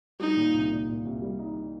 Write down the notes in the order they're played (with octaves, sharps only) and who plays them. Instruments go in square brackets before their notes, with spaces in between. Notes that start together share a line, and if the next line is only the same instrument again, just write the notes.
[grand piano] G3 [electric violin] D#4
[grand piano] A#2
C2
A#2
A#2
C2
G3
D#4